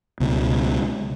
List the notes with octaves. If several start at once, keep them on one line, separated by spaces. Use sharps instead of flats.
C#2 B2